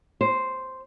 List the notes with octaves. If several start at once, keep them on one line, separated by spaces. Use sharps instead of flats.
C5